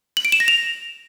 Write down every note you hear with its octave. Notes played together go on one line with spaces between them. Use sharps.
F#7
D7
E7
A#6
F7